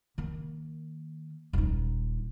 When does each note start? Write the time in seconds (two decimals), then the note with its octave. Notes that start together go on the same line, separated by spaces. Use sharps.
0.18 D#3 A#3
1.53 D#1 D#4